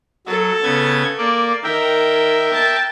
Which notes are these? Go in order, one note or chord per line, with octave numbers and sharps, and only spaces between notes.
F#3 A4
C#3 B3 G#6
A#3 D5
D#3 A#4 E5 G5
A5